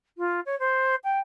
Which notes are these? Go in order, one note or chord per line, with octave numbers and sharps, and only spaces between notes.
F4
C#5
C5
G5